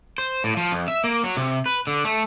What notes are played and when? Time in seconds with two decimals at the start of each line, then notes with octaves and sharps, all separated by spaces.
0.18 C5
0.44 A2
0.57 F3
0.72 F2
0.88 E5
1.04 A#3
1.24 F#3
1.37 C3
1.66 B4
1.87 D3
2.05 A3